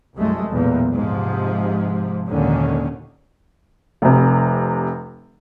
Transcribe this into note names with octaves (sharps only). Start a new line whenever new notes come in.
C2 F#2 G#3 A3
B1 E2 A#2
G#2 C3 F3
G#1 D#2 A#2 D3 D#3 C#4
F1 C3